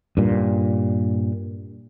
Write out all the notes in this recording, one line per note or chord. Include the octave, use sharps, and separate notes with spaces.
G2 A#2